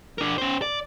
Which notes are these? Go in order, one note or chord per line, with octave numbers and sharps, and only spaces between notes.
D4 A#4
C#4 C5
D5